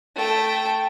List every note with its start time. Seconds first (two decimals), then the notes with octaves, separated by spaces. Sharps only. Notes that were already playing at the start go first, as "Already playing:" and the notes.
0.15 A3 G5